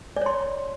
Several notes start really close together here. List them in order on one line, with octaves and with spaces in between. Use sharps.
D5 C#5 C6